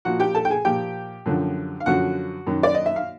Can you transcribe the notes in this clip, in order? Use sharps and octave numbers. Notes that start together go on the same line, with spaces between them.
A#2 F3 F#4 F#5
G4 G5
A4 A5
G5
G#4 G#5
A#2 F3 G4 G5
F#2 D3 F3
F5
F#2 D3 F3 F#4 F#5
F#2 D#3
D5
D#5
E5
F5